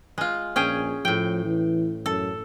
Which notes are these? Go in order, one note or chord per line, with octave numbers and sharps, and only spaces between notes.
G#3 F4
A#1 C#4 G#4 G5
A2 F3 G5
E3
F#2 A4